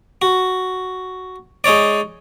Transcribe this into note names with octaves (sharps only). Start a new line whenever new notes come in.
F#4
G#3 D#4 C#5 D5